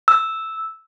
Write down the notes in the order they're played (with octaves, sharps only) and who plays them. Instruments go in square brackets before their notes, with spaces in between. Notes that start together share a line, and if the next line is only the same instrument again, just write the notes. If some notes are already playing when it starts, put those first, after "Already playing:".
[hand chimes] E6